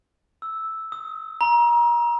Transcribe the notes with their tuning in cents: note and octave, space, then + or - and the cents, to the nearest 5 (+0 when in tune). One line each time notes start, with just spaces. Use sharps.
E6 -5
D#6 +30
A#5 +30